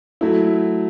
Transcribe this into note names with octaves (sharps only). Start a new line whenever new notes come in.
F#3 A3 E4